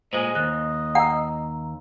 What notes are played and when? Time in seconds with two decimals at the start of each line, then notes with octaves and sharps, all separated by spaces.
0.13 A#2 G#3 C5 D#5 G#5
0.35 D#2 F#6
0.95 F#5 A#5 E6